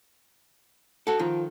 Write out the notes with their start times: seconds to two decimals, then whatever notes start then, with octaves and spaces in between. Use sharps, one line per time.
1.07 F#4 A4
1.19 D#3 F3